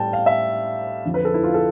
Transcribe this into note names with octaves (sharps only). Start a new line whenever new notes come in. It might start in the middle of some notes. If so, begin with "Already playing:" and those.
Already playing: A2 G3 G5 A5
F5
E5
F2 D3 F3
B4
A4
E4
F4
A4